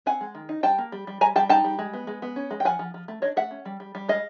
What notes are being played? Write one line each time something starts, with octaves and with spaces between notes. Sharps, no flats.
C4 F#5 G#5
G#3
D#3
D#4
G3 G5 A5
A#3
G3
G3
G3 G#5 A#5
G3 G5 A5
D#4 G5 A5
G3
G#3
B3
G#3
B3
C#4
G#3
G5
F3 F#5 G#5
F3
F3
A3
D4 C#5 D#5
A3 E5 F#5
C#4
G3
G3
G3
G#3 D#5 F5